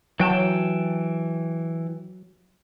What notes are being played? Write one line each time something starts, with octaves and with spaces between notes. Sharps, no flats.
E3 F#3 G5 A5